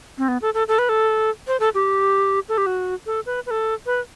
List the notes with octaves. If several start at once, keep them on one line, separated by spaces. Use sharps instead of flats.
C4
B3
A4
A4
A4
B4
A4
C5
A4
G4
A4
G4
F#4
A4
B4
B4
A4
B4